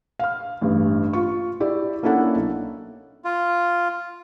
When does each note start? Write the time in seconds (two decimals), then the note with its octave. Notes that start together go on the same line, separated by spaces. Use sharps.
0.19 F5 F6
0.61 A1 G2
1.13 F4 C#6
1.60 E4 G4 D5
2.03 A#3 C#4 D4 E4 A4 F#5
2.36 B1
3.25 F4